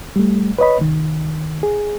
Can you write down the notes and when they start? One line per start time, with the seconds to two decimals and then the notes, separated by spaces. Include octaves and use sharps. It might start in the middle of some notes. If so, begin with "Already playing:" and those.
0.16 G3 A3
0.59 B4 C#5 D#5 B5
0.80 C2 D#3
1.63 G#4